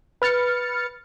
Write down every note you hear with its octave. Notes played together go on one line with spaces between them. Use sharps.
B4 F6 A6 C#7